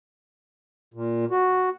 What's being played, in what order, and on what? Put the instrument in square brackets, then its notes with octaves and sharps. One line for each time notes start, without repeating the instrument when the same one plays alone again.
[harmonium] A#2
F#4